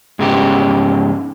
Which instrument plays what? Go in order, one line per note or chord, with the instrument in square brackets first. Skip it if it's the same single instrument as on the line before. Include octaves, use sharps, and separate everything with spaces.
[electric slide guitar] G#2 C#3 G4